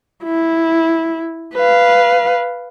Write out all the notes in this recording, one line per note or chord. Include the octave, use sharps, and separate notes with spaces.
E4
B4 F5